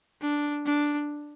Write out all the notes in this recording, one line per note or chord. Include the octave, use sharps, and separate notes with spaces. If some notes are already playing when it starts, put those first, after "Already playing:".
D4
D4